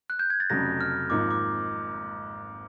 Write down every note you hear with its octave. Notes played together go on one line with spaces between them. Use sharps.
F#6
G6
G#6
A6
F1 F2 C#3 F#3 A3 A#6
F6
G#1 G#2 F3 A#3 D#4 D6
D6